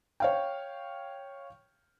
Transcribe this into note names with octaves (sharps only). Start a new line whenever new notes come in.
C#5 F5 G5